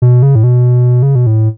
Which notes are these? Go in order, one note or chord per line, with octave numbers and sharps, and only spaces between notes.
B2
C#3
A2
B2
C#3
B2
A2